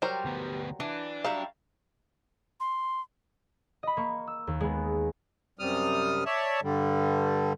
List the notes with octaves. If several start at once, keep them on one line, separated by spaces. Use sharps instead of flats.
F#3 G3 A#4 C5
D2 B3
E3 D4
F#3 G3 E5 F5
C6
D#5 B5
A#3 C#6
E6
D#2
G#3 B3
F#2 C3 G3 D#6 F6
C#5 D5 E5 A5
G2 D3 G3